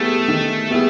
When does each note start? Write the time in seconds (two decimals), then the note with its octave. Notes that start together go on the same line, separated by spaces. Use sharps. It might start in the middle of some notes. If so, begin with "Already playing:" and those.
Already playing: G3 A3 B3 E4 G#4
0.28 D#3
0.70 G3 B3 E4 G#4